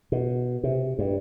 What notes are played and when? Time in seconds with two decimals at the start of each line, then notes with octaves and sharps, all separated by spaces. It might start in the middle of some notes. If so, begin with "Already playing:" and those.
0.12 B2
0.63 C3
0.99 G2